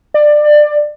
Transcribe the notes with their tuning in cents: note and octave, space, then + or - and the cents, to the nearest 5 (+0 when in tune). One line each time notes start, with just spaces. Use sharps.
D5 +20